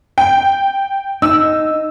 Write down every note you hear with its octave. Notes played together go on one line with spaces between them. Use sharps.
G5
D#4 E6